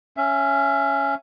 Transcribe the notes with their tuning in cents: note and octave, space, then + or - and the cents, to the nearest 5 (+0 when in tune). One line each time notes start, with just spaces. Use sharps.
C#4 +0 E5 +25